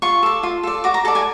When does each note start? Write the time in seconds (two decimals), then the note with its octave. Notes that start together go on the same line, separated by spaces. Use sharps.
0.02 F4 C#6
0.23 A4 D5
0.43 F4
0.63 A4 D5
0.84 F#4 D6
0.94 A#5
1.05 A4 D5 A5
1.15 G#5